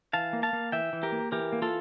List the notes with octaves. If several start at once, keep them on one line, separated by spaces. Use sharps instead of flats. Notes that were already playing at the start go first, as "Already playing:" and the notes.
E3 F5 A5
A#3
F5 A5
A#3
E3 E5 G5
E3
G4 A#4
A#3
E3 G4 A#4
A#3
F4 A4